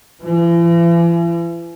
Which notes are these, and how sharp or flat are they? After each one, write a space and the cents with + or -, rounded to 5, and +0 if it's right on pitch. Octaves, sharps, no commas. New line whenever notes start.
E3 +45